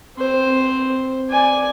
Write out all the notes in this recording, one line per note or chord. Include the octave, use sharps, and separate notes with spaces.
C4 C5
D5 G#5